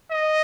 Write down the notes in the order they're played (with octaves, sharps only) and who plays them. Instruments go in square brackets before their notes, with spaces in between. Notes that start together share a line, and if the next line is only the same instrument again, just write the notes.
[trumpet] D#5